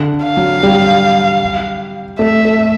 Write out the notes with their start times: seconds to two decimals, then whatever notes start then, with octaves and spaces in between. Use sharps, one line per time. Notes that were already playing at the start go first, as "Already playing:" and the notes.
Already playing: D3
0.24 F5
0.37 F#3
0.63 G3
2.19 A3 E5
2.45 A3